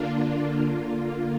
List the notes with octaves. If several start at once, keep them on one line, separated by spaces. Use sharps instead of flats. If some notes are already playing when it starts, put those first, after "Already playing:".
Already playing: D3 A#3 D4 F4
D3 A#3 F4